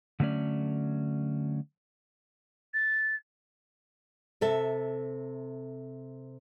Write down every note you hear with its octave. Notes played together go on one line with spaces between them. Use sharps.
D3 F#3 A3 C#4 D5
A6
C3 A4 E5